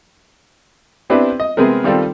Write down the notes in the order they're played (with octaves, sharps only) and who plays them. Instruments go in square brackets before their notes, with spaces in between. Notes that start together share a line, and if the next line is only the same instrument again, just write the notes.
[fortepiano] B3 C4 D4 E4 G4 B4
D#5
C3 G#3 B3 C4 A#4
D#3 G3 C4 F4 A4